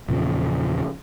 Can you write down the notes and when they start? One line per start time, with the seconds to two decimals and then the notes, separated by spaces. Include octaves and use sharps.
0.09 E2 A#2 C#3 F3